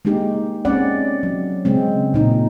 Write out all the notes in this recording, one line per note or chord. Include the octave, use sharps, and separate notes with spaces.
G#3 A#3 D#4 G4
G#3 C4 C#4 D5 F#5
F#3
C#3 G#3 C4
A#2 D#4